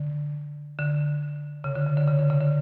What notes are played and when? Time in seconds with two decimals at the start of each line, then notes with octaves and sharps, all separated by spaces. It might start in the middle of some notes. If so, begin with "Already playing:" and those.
Already playing: D3
0.79 D3
1.64 C#3
1.75 D3
1.87 C#3
1.97 D3
2.07 C#3
2.19 D3
2.30 C#3
2.41 D3